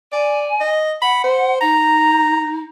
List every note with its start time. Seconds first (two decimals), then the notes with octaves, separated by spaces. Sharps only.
0.13 D5 G#5
0.61 D#5
1.02 F#5 B5
1.24 C5
1.61 D#4 A#5